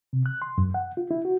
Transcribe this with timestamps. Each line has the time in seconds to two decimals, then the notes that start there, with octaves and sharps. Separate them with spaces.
0.13 C3
0.26 F#6
0.42 C6
0.58 F#2
0.74 F#5
0.97 F4
1.11 E4
1.25 F#4